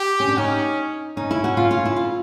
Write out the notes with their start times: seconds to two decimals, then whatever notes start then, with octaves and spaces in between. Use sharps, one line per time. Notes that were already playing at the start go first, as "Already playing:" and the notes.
Already playing: G4
0.20 C#4
0.28 D4
0.38 C#4 D#4
1.17 C#4 D#4
1.31 E4
1.44 F#4
1.57 F4
1.71 F4
1.85 E4
1.96 F4